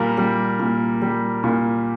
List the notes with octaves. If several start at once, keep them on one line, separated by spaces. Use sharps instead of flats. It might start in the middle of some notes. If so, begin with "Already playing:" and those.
Already playing: A#2 G3 A#4
G3
A#2
G3
A#2